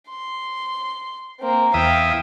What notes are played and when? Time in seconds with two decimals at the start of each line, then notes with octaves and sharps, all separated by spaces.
0.10 C6
1.40 A#3 C4
1.74 E2 E5 F5 G5 D#6